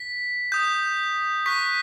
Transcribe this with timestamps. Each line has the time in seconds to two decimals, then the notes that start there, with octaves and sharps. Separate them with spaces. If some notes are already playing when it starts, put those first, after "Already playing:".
Already playing: B6
0.52 D#6 G6
1.46 C#6 F#6 B6